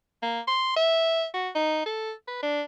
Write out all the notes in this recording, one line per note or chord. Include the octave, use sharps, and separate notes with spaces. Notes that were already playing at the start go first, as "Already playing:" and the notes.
A#3
C6
E5
F#4
D#4
A4
B4
D4